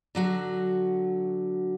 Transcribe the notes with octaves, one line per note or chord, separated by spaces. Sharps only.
D3 F#3 F#4